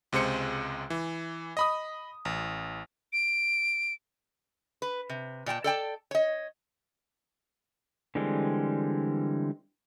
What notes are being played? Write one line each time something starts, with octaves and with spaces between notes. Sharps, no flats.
C#2 C3 G#3 C5 C#7
E3
D#5 B5 D#6
A1
D7
B4
C3
A#2 D5 G5 A5
A4 D5 G5 A5
C#5 D#5
D3 E3 G3 G#3 C4